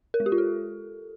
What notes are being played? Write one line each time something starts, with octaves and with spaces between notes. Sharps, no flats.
A#4
G#3
G4
F4
A4